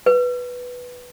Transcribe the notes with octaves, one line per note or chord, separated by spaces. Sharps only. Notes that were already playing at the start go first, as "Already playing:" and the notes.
B4